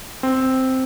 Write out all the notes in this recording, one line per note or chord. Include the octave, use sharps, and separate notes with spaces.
C4